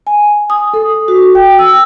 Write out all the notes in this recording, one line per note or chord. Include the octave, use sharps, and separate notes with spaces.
G#5
D#6
A4
F#4
G5
E6